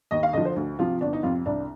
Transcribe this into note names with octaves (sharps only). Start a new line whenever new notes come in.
D#2 D#5
F5
D3 F3 D#5
C5
D2
C3 F3 F4
G1 D4
D#4
F2 C3 F4
C2 D4